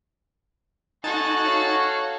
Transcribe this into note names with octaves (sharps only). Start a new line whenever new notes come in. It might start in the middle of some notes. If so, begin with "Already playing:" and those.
D#4 F#4 A4 F#5 G#5 A5 A6
C#5 F5